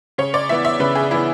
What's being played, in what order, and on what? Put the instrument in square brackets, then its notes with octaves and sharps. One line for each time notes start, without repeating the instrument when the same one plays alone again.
[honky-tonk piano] C#3 C#5
D5
E3 B3 E5
E5
C#3 B4
G#4
E3 B3 E4